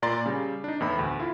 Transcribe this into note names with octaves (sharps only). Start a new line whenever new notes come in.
A#2 D5 A#5 C6 A6
C#3 G3
D4 D#4
E2 A2 B5
D2
E4 F4